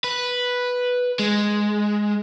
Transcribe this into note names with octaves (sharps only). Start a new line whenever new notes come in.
B4
G#3